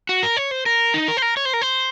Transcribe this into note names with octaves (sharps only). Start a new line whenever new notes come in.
F#4
A#4
C#5
C5
A#4
D#4
A#4
C5
A#4
C#5
C5
A#4
C5